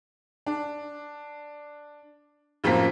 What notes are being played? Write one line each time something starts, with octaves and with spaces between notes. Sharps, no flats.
D4
A1 F#2 F3 A#3 C4 B6